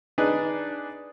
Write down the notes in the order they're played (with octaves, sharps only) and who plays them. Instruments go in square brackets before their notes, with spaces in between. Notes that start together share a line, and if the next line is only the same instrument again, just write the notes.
[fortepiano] D4 D#4 G#4 B4